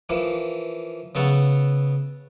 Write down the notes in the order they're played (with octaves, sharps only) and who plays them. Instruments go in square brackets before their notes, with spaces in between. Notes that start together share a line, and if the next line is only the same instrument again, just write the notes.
[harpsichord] E3 F3 A#3
C#3 B3 A4 C#5 F#5